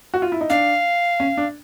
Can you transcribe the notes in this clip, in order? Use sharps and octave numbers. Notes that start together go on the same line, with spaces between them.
F#4
F4
E4
D#4
D4 F5
C#4
D4